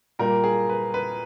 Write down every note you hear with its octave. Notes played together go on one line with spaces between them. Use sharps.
A#2 G3 A#3 A#4
G#4
B4
B4